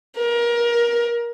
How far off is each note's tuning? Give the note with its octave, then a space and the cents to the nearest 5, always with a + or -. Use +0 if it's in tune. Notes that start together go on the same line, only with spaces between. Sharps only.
A#4 +25